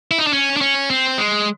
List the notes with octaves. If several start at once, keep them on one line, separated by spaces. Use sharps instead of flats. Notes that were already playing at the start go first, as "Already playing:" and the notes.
E4
D#4
D4
C#4
D4
C#4
C4
G#3